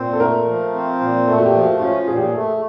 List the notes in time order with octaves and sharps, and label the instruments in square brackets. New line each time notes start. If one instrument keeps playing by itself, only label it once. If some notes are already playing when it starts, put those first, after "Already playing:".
Already playing: [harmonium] A#2 C4
[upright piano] A4
[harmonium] A3 [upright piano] A#4
[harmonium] F3
C4
A#2
[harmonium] A3 [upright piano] A4
[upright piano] F#4
G4
[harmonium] F3
[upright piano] F#4
[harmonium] C#4 [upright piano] F4
[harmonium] A#2 [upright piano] G#4
[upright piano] G4
G#4
[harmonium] A3 [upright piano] A4